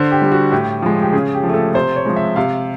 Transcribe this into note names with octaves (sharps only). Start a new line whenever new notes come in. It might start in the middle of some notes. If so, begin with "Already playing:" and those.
Already playing: D3 C5
G4
G3
F#4
A2 G4
F3 G#3
G4
C#3 G#4
G4
F3
A3 A4
C3 C5
C#5
F3 G#3
E5
C3 F5